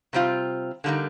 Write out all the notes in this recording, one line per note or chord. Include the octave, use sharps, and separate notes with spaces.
C3 G3 C4 F4
D3 G3 A#3 D#4